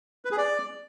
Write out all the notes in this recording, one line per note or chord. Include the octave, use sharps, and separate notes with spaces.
B4
G#4
D5